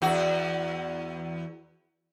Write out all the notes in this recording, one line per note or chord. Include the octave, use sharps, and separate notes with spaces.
E2 F#4